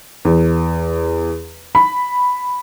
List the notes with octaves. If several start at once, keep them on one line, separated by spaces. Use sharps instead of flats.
E2
B5